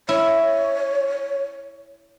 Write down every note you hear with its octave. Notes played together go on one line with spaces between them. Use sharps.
E4 C#5